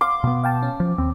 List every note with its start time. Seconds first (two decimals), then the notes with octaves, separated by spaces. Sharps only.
0.01 F5 C6 D6
0.24 B2 B3
0.44 F5 G5 A5
0.63 C#4
0.80 F3
0.98 D#2 C4